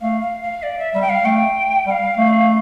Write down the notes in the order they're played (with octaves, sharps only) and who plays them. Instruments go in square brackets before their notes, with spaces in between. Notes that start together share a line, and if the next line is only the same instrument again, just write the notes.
[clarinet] A3 [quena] F5
[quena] F5
F5
D5
E5
[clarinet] G3 [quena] E5
[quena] G5
F5
[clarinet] A3 [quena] G5
[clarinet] G3 [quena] F5 G5
[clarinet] A3